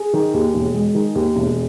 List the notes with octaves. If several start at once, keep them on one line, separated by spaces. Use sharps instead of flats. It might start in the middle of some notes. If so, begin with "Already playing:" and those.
Already playing: G#4
D#3
D#2
E1
G#3
D#3
D#2
E1